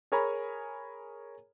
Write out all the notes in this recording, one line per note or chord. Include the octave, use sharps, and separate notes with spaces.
G#4 A#4 C#5 G#5 A#5 B5